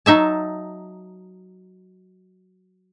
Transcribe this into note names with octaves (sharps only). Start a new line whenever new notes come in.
F#3 D#4 E5 A5